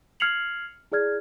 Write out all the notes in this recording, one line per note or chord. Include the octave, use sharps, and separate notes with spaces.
F6 G#6 C7 C#7 F7 F#7
E4 G#4 D5 F6 G#6